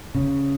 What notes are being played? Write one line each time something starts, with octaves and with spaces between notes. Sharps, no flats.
C#3